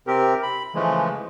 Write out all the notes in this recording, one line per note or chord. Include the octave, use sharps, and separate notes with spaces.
C3 C4 G4 A#4
B5
C#3 E3 F3 G#3 A3